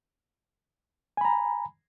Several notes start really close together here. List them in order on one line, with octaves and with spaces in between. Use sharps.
G#5 B5 A#5